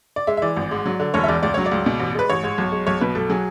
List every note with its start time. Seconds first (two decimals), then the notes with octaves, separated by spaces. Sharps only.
0.16 D5
0.27 G#3 E5
0.37 E5
0.42 E3 D5
0.56 G#1
0.71 G#2
0.86 F#3
1.00 D3
1.14 E1 C#5
1.23 E5
1.28 E2 D5
1.43 C#2 D5
1.54 F#3 C#5
1.66 D5
1.71 C#2
1.86 B2
2.00 A1
2.15 G#3 B4
2.29 A1 C#5
2.43 G#2
2.58 B1
2.72 G#3
2.87 B1 C#5
3.01 B2 B4
3.15 B1 A4
3.30 F#3 G#4